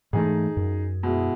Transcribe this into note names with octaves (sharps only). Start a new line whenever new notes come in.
G#2 E3 A3 D#4 G#4
F#2
B2 G#3 E4